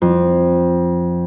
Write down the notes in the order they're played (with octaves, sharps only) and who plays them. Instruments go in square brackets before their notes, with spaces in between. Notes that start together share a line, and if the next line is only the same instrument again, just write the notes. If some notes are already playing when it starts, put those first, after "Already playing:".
[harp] F2